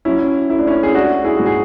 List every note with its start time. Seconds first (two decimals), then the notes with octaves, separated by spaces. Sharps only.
0.05 F#3 C#4 E4
0.50 A3 E4
0.59 D4
0.67 C#4 E4
0.83 G#4
0.95 G#3 D4 F#4
1.25 E4 G#4
1.37 G#2 F#4
1.46 G#4